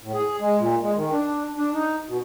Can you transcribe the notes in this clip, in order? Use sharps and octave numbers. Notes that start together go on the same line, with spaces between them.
A2
G#4
G#3
A#2
G#3
D#3
D4
D4
D#4
B2